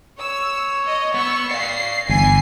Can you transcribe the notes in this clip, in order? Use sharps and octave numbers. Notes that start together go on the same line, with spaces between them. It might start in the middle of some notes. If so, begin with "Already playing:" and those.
C#5 E6
D#5
B3 C#6 E6
D5 F5 C7
G1 E3 G#5 C7